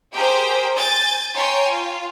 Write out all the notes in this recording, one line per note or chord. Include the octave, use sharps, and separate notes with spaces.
G4 G#4 A#4 C5 G5
G#5 G6 A6
C#5 G5 G#5 A#5 C6
F4